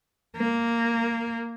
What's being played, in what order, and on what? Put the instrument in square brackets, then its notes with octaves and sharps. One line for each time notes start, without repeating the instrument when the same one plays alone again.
[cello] A#3